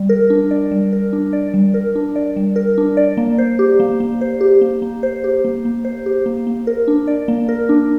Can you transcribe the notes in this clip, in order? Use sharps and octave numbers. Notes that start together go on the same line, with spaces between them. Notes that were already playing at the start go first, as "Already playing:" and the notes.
Already playing: G3
A#4
D4
D5
G3
A#4
D4
D5
G3
A#4
D4
D5
G3
A#4
D4
D5
A#3
C5
G4
A#3
A#3
C5
G4
A#3
A#3
C5
G4
A#3
A#3
C5
G4
A#3
A#3
A#4
D4
D5
A#3
A#4
D4